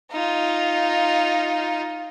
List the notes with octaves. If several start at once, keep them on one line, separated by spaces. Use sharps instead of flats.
D#4 F4